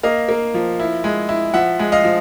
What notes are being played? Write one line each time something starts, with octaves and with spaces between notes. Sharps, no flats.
A#3 D#5 F5
A#3
F3
E4
G#3
E4
F3 E5 F#5
G#3
D#5 F5
F3